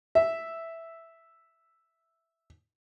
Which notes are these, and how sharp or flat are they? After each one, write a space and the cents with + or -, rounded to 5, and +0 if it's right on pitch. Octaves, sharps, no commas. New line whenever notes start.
E5 +0